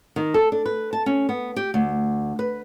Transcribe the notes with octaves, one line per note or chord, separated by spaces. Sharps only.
D#3
A4
D4
B4
A5
C#4
B3
G4
D2
B4